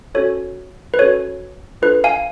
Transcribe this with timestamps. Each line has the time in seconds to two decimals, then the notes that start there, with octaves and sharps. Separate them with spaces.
0.15 C#4 F#4 A4 C#5
0.94 B4
0.99 C#4 F#4 A4 C#5
1.82 D4 F4 A4 B4
2.04 F5 G#5